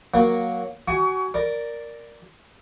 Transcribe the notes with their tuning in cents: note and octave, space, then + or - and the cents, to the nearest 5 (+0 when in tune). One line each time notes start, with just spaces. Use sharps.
F#3 +0 A#3 +5 F#4 +0
F#4 +25 G#5 +0 C#6 +35
A#4 +0 D5 +0